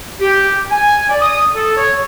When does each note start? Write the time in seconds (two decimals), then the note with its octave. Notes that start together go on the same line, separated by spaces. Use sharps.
0.21 G4
0.71 G#5
1.09 D5
1.21 D#6
1.55 A4
1.77 C#5